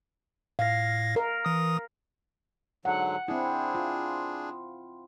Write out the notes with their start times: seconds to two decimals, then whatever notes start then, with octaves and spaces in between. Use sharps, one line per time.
0.59 A2 F5 A#6
1.16 A#4
1.45 E3 D#6
2.85 G#2 D3 F#3 F#5
3.28 C4 D4 E4 G#4
3.75 F4